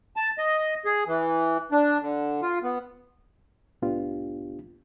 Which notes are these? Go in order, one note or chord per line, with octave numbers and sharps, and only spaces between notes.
A5
D#5
G#4
E3
D4
D3
F4
B3
C2 A2 B3 D4 F4 G4